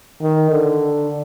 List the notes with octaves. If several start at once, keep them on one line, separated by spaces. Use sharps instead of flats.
D#3
D3